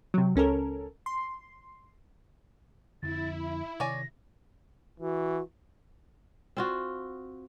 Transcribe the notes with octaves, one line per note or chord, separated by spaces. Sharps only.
C3 F#3
C#2 C#4 A4 A#4
C6
F2 D3 F3 E4 A6
B5
C3 D#3 C#5 D5 G#5 A#6
E3 F#4
C4 F4 F#4